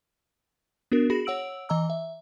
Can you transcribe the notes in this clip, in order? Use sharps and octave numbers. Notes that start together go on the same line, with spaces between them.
B3 D4 F#4 A#4
F#4 G#4 B5 A#6
C#5 F#5 E6 D7 F#7
E3 D#5 A#5 E6
E5